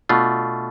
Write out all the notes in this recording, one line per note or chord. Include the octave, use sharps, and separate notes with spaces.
B2 A3 D4 F4